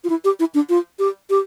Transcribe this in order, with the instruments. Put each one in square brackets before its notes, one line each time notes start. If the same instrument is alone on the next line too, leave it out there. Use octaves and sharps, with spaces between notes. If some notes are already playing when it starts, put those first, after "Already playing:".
[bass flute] F4
E4
G4
E4
D4
F4
G4
G4